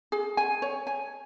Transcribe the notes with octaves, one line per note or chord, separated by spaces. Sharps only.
G#4
G#5
C#5
G#5